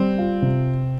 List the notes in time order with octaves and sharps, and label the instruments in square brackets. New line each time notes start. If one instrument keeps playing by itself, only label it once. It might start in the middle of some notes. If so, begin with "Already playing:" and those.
Already playing: [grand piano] G3 [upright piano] C4
[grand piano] F4
C3